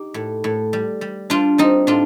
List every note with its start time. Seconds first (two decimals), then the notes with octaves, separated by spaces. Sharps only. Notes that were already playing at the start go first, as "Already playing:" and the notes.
Already playing: D#4 G4
0.14 A2
0.44 A2
0.73 G3
1.01 G3
1.30 G3 D4 F4
1.58 G3 C4 D#4
1.87 A2 D4 F4